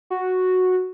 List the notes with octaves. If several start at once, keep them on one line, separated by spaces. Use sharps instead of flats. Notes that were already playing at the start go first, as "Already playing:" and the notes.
F#4